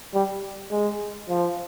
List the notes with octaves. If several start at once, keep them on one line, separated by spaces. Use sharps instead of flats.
G3
G#3
F3